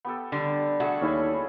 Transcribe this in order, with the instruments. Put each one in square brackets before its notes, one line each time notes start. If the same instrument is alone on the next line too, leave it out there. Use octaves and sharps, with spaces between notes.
[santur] B3 G4 A4
[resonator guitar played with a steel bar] D3 G3
[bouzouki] A3 F#4 [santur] G#4 E6
[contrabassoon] D#2 [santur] C#4 E4 G#5